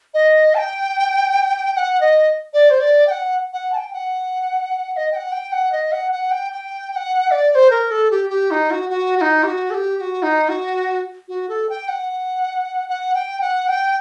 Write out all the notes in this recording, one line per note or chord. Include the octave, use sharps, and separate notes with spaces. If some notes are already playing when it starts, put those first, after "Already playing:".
D#5
A5
G5
G5
F#5
D#5
D5
C5
D5
G5
F#5
F#5
A5
G5
F#5
F#5
D#5
G5
F#5
G5
F#5
D#5
F#5
F#5
G5
G5
G5
F#5
D5
D5
C5
A#4
A4
G4
G4
D#4
F#4
F#4
F#4
D#4
G4
F#4
A4
G4
G4
F#4
D#4
F#4
F#4
A4
G5
F#5
F#5
G5
F#5
G5